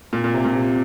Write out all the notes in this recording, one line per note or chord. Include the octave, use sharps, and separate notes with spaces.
A#2
A#2
C3
A#2
C3